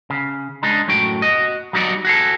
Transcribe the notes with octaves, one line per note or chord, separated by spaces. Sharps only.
C#3
G#3 D4 D#4
F#2 A2 F#4 G5
F#4 D#5
F#3 G3 D#4 F#4 D5
F#4 G#4 A4